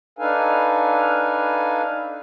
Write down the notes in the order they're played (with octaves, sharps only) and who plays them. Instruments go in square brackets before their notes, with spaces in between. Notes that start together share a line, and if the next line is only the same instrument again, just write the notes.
[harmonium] D4 D#4 A4 B4 F5 G#5